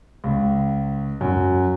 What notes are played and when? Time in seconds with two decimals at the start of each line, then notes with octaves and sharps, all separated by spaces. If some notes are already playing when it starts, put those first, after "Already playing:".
0.24 C#2
1.21 F#2